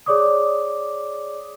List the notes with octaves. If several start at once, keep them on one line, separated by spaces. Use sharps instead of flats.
G#4 C#5 D5 D6 D#6